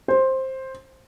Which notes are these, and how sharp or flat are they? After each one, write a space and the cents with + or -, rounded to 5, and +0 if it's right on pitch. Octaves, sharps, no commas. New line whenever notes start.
C5 +10